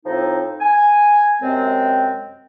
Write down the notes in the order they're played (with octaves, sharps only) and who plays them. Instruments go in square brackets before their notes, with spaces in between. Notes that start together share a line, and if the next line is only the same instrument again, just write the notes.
[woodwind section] A2 F3 C4 D#4
G#5
F#2 C3 G#3 C4